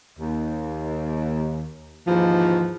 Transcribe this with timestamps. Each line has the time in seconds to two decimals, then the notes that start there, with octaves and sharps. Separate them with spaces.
0.18 D#2
2.07 D#2 G#2 E3 F3